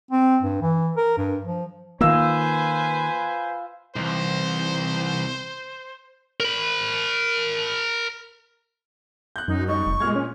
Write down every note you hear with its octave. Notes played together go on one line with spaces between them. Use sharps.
C4
G2
E3
A#4
G2
F3
D#3 A#3 F4 B4 C5 G#5 E6
C2 E3 D#4 C5
A#4 B5
F#6 G6
F#2 D#4
G3 D#4 C#6
F1
A#2 G#3 F6 G#6
C#4